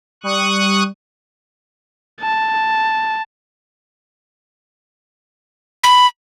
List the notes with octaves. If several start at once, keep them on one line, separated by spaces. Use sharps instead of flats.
G3 C#6 D#6 F#6
A5
B5